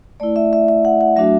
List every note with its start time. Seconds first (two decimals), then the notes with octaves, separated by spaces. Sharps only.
0.20 A3 E4 D5
0.36 E5
0.53 E5
0.69 E5
0.85 F#5
1.01 F#5
1.16 F#3 A3 D4 F#4 E5